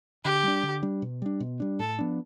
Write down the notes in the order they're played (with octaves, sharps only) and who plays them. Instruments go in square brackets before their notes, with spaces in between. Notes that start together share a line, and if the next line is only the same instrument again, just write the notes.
[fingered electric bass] D3 [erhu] G4
[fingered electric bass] G3 D4
D3
G3 D4
B2
G3 D4
B2
G3 D4
[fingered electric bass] A2 [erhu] A4
[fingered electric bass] F3 B3 D4